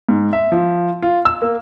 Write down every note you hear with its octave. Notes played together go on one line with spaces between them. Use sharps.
G#2
E5
F3
F4
E6
A#3